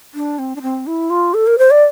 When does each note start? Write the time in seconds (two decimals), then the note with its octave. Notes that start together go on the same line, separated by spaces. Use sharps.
0.14 D4
0.39 C4
0.56 D4
0.62 C4
0.87 E4
1.10 F4
1.34 A4
1.47 A#4
1.58 C5
1.71 D5